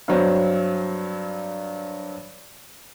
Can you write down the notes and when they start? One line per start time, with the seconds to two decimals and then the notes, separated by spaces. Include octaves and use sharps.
0.08 G2 F#3 C4